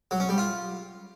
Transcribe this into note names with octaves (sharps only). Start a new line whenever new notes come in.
F#3
C#4
G3
F4